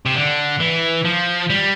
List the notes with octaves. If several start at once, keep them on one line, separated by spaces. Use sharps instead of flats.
C3
D3
E3
F3
G3